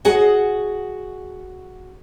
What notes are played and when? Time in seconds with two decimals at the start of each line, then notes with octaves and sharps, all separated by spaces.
0.05 F#4 G#4 D#5 F#5